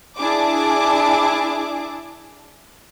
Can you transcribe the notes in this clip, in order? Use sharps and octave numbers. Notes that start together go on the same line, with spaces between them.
D4 E4 G#4 A5 D6